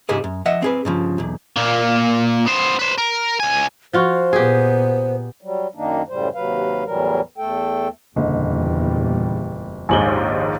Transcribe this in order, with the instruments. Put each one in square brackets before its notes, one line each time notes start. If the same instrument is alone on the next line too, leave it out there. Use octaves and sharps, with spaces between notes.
[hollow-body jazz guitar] G#2 C#3 G4 G#4 C5 D#5
F#2
F3 D#5 E5 F#5
C4 G#4 B4
G2 C#3 F3
B1 E2
[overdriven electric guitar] A#2 A#3
B3 C5
B4 C5
A#4
C#2 G#5
[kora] F3 F4 F#4 [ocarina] C5
[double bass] A#2 B3 [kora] G4 G#4
[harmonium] F#3 G3
F#2 D#3 A#3 D4 D#4
F#2 A2 C#3 G3 C5
D#2 C3 F#3 B4 F5
E2 A2 E3 F#3 G3 A#4
E2 A3 A4 G5
[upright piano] F#1 [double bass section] E2 A#2 G3 [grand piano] D3 D#5
[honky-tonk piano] A#1 D#2 G#2 [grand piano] G#5 F#7 G7